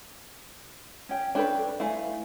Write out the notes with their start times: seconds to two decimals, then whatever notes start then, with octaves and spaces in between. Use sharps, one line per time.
1.09 C#4 G5
1.35 D4 A4 B4 C#5 G5
1.80 A3 E4 F5 G#5